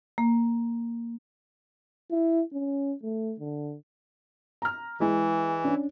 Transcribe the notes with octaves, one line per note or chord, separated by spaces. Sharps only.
A#3
E4
C#4
A3
D3
A#5 F6
E3 G#3 E4
C#4 D4